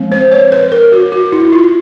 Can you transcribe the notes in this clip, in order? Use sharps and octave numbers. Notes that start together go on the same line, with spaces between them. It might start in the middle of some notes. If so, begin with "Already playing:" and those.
Already playing: F3 G#3 C4
C5
C#5
B4
A#4
F#4
F#4
E4
F4